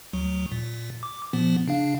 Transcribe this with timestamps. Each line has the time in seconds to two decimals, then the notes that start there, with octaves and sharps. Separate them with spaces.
0.13 D2 F#3
0.52 A#2
1.03 D6
1.33 A#2 F3 B3
1.68 C#3 D4 F5